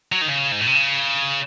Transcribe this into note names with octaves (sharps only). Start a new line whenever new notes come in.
F#3
D#3
C#3
G#2
A2
C3
C#3